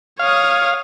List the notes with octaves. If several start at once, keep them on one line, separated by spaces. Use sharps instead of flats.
C#5 F5 D#6